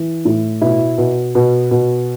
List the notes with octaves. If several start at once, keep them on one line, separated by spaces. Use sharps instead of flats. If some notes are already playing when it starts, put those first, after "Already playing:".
Already playing: E3
A2
B2 E4
B2
B2
B2